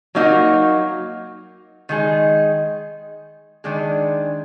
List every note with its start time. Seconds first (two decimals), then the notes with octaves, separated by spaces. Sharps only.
0.15 F#3 A#3 D#4 F#4
1.89 D#3 G#3 D#4 G#4
3.64 D#3 G#3 D4 G#4